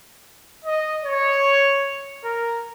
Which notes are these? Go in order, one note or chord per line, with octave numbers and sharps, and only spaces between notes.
D#5
C#5
A#4